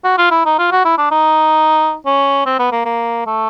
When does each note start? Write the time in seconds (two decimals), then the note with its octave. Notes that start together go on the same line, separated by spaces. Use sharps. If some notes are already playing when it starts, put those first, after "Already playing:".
0.04 F#4
0.18 F4
0.31 E4
0.46 D#4
0.59 F4
0.71 F#4
0.85 E4
0.98 D4
1.11 D#4
2.06 C#4
2.46 C4
2.59 B3
2.72 A#3
2.86 A#3
3.26 A3